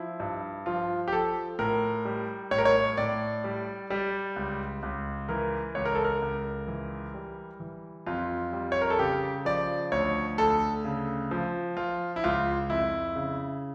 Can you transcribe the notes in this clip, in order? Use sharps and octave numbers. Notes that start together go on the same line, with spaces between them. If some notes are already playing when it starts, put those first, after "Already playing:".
Already playing: F3 E4
G2
F3 F4
G4
F3 A4
A2 A#4
G3
A2 C#5
A#4
C#5
A2 D5
G3
G3
C#2
C#2
E3 A#4
C#2 C#5
A#4
A4
A#4
C#2
E3
G3
E3
F2 F4
G3
C#5
A#4
A4
C#3 G4
F3 D5
D2 C#5
D2 A4
C#3
F3
F3 F4
E4
C#2 F4
F2 E4
C#3